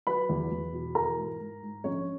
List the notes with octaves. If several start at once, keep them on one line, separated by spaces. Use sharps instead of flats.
F#3 B4 B5
E2
E2
B2
E3 A#4 A#5
G#2
G#2
G#2
A#1 C#4 C#5